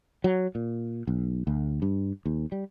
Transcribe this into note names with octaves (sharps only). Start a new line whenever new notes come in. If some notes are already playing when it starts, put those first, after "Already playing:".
F#3
A#2
B1
D2
G2
D#2
G3